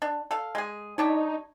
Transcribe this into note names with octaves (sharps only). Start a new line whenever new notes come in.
D4
A4 F5
G#3 G#4
G3 D4 D#4 C#5